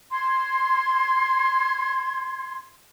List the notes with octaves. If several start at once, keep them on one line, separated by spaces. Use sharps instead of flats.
C6 G#6